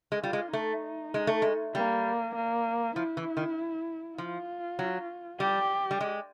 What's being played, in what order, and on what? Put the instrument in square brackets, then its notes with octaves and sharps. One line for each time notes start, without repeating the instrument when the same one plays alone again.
[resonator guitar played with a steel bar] G#3
[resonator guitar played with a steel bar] G3 [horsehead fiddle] F4
[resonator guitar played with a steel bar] G#3
[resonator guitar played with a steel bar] A3 [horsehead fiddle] D#4
[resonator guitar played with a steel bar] G#3
A3
G#3
[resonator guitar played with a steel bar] G3 [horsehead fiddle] A#3
[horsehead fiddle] A#3
[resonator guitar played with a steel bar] F3 [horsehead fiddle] E4
[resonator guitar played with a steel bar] E3
D#3
[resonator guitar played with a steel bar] F3 [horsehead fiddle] F4
[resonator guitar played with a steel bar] F#3
[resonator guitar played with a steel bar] G3 [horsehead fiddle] G4
[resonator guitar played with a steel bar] G3
G#3